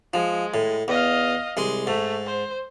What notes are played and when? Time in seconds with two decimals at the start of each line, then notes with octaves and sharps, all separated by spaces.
0.14 F3 G#3
0.54 A2
0.88 E2 D#5 F5
1.57 C2 G#3 C6
1.87 G#2 A3
2.26 C5